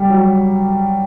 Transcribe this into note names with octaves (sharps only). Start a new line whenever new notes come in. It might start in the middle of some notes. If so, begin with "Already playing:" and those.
Already playing: G3
F#3